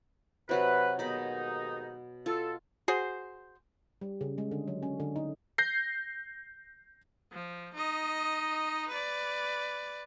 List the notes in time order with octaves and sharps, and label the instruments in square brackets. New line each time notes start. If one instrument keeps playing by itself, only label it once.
[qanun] C3 F#3 B5 [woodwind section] B4
[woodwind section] D#2 G#2 D#4 [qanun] B2 B5
[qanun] F4 [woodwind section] A4
[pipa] F#4 G#4 C5
[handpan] G3
C#3
G#3
D3
F#3
C#4
D3
D#4
[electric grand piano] G6 A#6 C7
[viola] F3
D#4 D#5
B4 D5